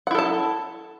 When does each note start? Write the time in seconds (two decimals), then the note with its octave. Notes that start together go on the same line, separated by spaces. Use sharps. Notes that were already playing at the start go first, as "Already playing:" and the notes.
0.07 F#5
0.11 E4
0.15 A4
0.19 A5